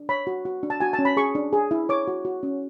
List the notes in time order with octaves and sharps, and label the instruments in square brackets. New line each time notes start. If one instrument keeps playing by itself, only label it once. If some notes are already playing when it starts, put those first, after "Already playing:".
Already playing: [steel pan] D4
C#5 B5
F#4
F#4
D4
A5
F#4 G#5
A5
C#4
B5
G#4 C#6
D4
G#4
E4
C#5 D6
F#4
F#4
C#4